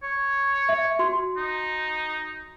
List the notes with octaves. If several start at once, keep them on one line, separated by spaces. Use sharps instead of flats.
C#5
E5
F#4 C6
D#4